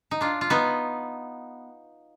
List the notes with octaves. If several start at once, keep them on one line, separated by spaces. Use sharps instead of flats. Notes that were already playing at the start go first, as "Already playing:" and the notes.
D#4
D4 F4
F4
B3 D#4